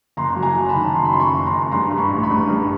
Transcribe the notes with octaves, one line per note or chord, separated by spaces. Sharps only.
F#1 A#5 C6
F#3
G#5 A#5
F#3
A5 B5
D#3
F#1 A#5 C6
B5
F#2 C6
B5 C#6
F#1
A#5 C6
F#2
G2 A#5 C6
G2
B5 C#6
A1
B5 C#6
G2
G2